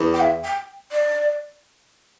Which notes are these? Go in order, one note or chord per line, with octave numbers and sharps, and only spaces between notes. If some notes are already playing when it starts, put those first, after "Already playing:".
Already playing: E2
G5
E5
G5
D5